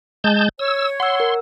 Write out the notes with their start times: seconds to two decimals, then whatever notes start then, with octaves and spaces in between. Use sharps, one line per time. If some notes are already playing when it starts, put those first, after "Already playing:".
0.24 G#3 A5 G6
0.59 C#5 E6
1.00 F#5 C6 E6
1.20 A#4